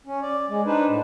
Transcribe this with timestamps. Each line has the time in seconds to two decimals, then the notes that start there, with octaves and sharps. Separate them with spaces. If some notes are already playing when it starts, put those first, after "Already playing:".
0.06 C#4
0.22 D5
0.49 G#3
0.66 D4 D#4 B4 C5
0.88 A2